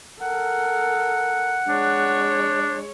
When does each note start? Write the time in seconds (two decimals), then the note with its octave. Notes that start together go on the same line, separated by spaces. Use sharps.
0.21 A4 A#4 F#5
1.68 G#3 D4 C#5